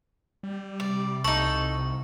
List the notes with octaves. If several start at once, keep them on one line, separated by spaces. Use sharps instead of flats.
G3
C3 D5
C2 D#4 A4 C#6